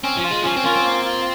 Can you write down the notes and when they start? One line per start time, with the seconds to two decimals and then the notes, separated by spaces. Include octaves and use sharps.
0.03 C4 C#4
0.17 F3
0.24 F4
0.31 G#3
0.44 F3 C#4
0.57 C4
0.64 A#3 F4
0.75 C4
0.84 A#3
1.05 F4